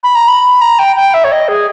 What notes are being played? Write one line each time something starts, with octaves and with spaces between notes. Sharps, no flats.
B5
A#5
B5
A#5
G5
G5
E5
C#5
D#5
G#4